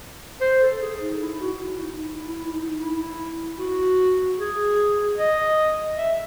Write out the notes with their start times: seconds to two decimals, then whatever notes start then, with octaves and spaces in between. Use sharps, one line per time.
0.41 C5
0.61 A4
0.80 G#4
1.00 D#4
1.20 E4
1.40 F#4
1.60 E4
1.80 D#4
2.00 E4
2.26 E4
2.45 E4
2.52 D#4
2.79 E4
3.59 F#4
4.38 G#4
5.17 D#5
5.97 E5